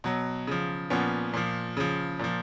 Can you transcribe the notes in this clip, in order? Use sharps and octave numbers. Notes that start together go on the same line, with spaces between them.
B2 F#3
C#3 F3
A#2 F3 B3 C#4
A#2 F3
C#3 F3
A#2 F3